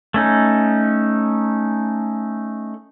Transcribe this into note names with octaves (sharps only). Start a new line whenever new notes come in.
A3 C#4 D#4